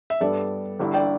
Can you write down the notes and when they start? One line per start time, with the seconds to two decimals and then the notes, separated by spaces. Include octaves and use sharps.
0.10 E5
0.21 G2 G3 B3 D4 A4 D5
0.79 G1 G2 D3 G3 E4
0.94 D5 G5